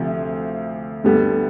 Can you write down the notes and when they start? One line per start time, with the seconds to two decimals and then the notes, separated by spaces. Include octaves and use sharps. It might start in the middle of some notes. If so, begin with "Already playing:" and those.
Already playing: D2 C3 F3
1.04 D2 D3 G3 B3